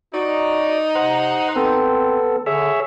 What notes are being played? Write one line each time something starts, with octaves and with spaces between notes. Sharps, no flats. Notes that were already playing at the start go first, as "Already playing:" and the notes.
D#4 F#4 D5
C3 C5 F#5
B3 C4 A4
D3 G#4 C#5 E5